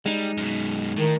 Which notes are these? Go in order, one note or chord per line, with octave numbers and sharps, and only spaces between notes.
G3 G#3 D#4
F#2 B2
A2 D#3